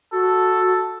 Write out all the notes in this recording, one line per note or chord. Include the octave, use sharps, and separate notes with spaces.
F#4 A4